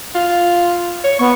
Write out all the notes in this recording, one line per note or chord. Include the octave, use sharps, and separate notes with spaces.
F4
C#5
B3 C#6